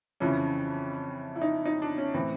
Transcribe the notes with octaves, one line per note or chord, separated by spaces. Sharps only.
F2 C#3 E3 C#4
E4
D#4
D#4
D4
C#4
A2 E3 C4